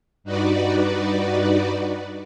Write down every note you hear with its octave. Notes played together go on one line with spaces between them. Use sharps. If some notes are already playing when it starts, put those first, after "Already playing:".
G2 D#4 F#4 B4 D5